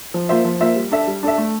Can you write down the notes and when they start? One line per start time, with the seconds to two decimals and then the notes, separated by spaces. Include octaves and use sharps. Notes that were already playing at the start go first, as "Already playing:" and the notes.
0.14 F3
0.29 A#3 F4 C5 E5
0.45 F3
0.60 A#3 F4 C5 E5
0.76 G3
0.91 D4 A4 E5
1.07 G3
1.23 D4 A4 E5
1.38 A3